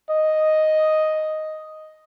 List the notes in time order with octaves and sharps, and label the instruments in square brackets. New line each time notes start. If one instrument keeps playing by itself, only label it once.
[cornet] D#5